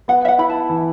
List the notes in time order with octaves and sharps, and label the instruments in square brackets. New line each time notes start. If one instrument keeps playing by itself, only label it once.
[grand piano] B3 [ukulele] F#5
[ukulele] E5
F#5
[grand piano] E4 [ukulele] B5
[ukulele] A5
[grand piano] E3